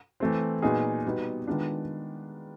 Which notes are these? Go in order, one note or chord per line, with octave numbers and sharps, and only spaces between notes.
E3 A3 C4
A#2 F#3 B3 D#4 G#4
B2 G3 B3 D#4
D#3 G#3 B3 D4 F4